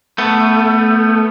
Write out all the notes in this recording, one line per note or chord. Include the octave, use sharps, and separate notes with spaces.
A3 B3